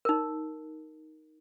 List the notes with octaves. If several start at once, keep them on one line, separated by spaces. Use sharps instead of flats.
D#4 A#4